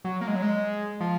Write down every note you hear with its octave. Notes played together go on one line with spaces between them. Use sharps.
F#3
A#3
G#3
F#3
G#3
F3